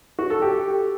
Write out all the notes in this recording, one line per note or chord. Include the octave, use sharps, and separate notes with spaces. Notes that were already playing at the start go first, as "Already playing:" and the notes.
F#4
A4
G4